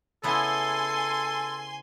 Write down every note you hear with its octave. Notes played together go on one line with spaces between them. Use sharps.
C#3 B3 E4 A4 G#5 C6